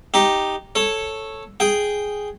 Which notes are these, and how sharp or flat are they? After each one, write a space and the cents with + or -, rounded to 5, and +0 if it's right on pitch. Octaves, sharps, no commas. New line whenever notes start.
D#4 +0 G4 +0
A4 +0 C#5 -10
G#4 +0 G5 +0